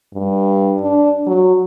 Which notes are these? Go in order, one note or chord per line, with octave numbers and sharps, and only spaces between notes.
G2
D4
F#3